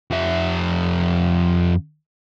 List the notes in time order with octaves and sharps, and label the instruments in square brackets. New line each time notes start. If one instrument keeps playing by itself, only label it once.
[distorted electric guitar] F2 E5